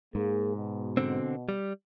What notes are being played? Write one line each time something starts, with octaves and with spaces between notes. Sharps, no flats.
G#2 A#3 G#4
B2
D3 C4
G3